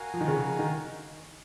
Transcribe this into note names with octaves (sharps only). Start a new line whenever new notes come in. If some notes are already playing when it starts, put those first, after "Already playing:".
Already playing: F#4 A#4 F5 G#5
F3
D#3
C#3
D#3